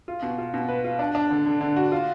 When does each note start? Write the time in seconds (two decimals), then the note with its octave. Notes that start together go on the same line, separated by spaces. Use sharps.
0.08 F4
0.22 B2
0.38 F4
0.54 B2
0.68 B4
0.84 F4
0.99 D4
1.15 D4
1.30 D3
1.46 D3
1.61 D3
1.76 F#4
1.92 F4